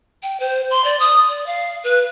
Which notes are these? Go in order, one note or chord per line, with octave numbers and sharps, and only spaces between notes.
G5
C5
C6
D5
D#6
D5
F5
B4